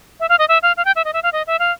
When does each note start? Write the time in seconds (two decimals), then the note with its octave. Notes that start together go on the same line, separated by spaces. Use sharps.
0.20 E5
0.29 F5
0.39 D#5
0.48 E5
0.63 F5
0.77 F5
0.85 G5
0.96 E5
1.05 D#5
1.13 E5
1.23 F5
1.33 D#5
1.47 E5
1.59 F5